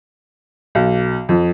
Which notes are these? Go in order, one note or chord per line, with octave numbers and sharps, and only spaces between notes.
B1
F2